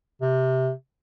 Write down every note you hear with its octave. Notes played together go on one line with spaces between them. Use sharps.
C3